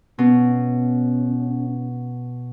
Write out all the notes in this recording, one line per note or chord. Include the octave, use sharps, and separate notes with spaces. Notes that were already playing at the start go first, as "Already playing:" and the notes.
B2 C#4